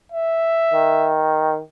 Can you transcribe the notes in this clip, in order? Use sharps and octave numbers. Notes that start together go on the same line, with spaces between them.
E5
D#3